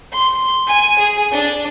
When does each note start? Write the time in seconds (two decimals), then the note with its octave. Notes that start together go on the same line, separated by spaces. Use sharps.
0.12 C6
0.67 G#5
0.98 G#4
1.31 D4